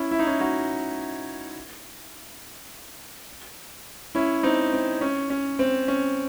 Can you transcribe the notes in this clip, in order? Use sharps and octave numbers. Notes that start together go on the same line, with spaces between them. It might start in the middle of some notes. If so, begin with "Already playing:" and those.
Already playing: C#4 E4
E4
D#4
C#4 E4
D#4 F#4
C#4 E4
C4 D#4
C4
C#4
C#4
C4
C#4